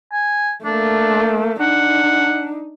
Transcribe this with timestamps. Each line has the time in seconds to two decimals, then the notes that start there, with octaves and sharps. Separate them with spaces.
0.12 G#5
0.65 A3 A#3 D4
1.60 D4 D#4 F#5